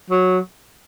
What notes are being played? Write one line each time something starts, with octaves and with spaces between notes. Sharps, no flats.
F#3